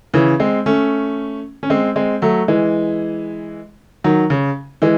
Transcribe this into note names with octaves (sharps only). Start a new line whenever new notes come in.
C#3 E3
G#3 C4
A3 C#4
C#4
G#3 C4
G#3 C4
F#3 A3
E3 G#3
D#3 F#3
C#3
E3 G#3